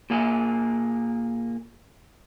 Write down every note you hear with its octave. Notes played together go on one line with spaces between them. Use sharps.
A#2 A#3 G#4